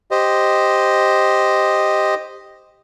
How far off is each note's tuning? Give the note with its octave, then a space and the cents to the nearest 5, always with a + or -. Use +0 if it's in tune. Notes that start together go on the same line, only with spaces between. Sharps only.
G4 +0 C5 +0 D#5 +0